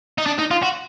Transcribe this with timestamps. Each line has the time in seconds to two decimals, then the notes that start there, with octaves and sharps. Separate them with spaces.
0.18 D#4
0.26 D4
0.39 D#4
0.51 F4
0.63 F#4